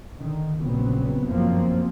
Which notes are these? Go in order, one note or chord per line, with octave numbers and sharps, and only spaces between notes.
D3 D#3
A#1 A#2 C#3 F#3 B3 C4
G1 F#2 F3 F#3 A#3 C4